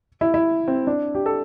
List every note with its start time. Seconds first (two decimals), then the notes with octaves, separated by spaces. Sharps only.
0.21 E4
0.34 E4
0.68 C4
0.87 D4
1.15 G4
1.26 A4